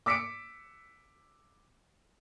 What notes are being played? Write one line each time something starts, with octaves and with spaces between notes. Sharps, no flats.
D6 E6 B6 C#7 D7